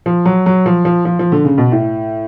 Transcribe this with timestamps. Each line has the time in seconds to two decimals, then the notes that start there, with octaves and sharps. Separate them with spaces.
0.06 F3
0.25 F#3
0.46 F#3
0.66 F3
0.85 F3
1.05 F3
1.19 F3
1.32 D3
1.45 C#3
1.58 B2
1.72 A2